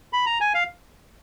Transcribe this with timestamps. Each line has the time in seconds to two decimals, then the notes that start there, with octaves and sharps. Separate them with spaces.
0.13 B5
0.26 A#5
0.41 G#5
0.54 F5